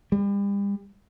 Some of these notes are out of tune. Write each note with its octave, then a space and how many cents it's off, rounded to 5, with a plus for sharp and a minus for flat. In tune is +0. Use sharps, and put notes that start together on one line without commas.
G3 +40